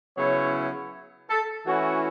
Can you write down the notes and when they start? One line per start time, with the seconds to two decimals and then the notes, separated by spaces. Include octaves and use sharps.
0.16 C#3 F#3 B3 E4 C#5
1.30 A4
1.66 E3 A3 C#4 E4 F#4